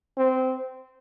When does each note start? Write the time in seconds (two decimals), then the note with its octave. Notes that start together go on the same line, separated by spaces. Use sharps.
0.17 C4